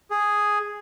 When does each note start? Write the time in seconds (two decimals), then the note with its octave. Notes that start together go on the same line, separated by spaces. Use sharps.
0.11 G#4